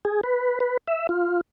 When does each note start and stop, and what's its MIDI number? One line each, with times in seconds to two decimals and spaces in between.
0.05 0.21 68
0.23 0.59 71
0.60 0.77 71
0.88 1.07 76
1.09 1.41 65